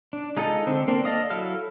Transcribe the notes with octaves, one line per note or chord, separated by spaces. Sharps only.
D4
G#3 D#4 F4 A4 D#5
D3 C4
A#3 C4 D4
A4 D5 D#5 F5 D#6
F#3 E4 A4 F5 F6